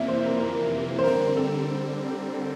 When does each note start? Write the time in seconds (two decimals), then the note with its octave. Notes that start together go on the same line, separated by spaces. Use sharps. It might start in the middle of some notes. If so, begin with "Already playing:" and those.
Already playing: F2 C3 E3 A#3 D5 E5
0.08 C5
0.25 A#4
0.40 A#4
0.99 C5
1.04 D3 G3 C4 A#4
1.37 A4